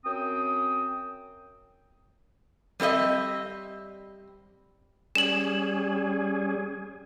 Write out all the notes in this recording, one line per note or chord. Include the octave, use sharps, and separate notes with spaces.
F#2 C4 G5 D#6
G3 C4 A4 D#5 E5
G3 C#4 G#4 E7 F#7